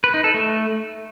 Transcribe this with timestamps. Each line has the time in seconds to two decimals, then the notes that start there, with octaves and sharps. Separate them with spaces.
0.04 B4
0.14 D#4
0.24 A4
0.34 A3